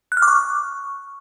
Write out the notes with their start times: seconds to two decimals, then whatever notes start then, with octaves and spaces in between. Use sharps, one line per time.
0.12 F#6
0.17 F6
0.22 D6
0.28 C#6